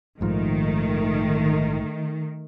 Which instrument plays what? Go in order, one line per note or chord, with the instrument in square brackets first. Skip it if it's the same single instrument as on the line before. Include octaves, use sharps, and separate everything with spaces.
[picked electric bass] A#1 G#2 F3 [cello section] D#3 [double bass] A3